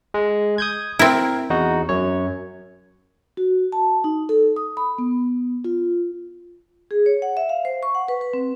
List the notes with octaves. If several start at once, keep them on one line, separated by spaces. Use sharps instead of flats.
G#3
D#6 G6 G#6
C4 E4 A#4
E2 D#4 F#4
F#2 C#5
F#4
A5
D#4
A4
D#6
B5
B3
F4
G#4
C#5
F#5
E5
F5
C5
C#6
F#5
B4
B4
C4